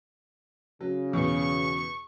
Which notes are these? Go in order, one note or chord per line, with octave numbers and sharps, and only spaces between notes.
C#3 F#3
E2 B2 C#6